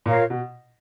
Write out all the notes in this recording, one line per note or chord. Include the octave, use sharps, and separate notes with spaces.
A#2 F4 A#4 C#5 F5
B2